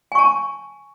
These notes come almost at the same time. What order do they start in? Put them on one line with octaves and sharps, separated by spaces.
G#5 C#6 A5